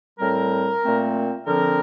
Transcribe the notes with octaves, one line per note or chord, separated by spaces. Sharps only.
A2 G3 C4 A#4
A#2 A3 C4
D3 F3 C4 A#4